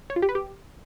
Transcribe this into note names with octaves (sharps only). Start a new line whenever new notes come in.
C#5
F4
G4
B4
G4